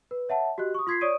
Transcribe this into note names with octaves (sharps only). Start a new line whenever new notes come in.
B4
C#5 E5 F#5 A5
F#4 G4 D#5 F#6
C#6 D#6
F4 C6 G#6 B6 C7
C#5 D5 C#6 D#6 D7 D#7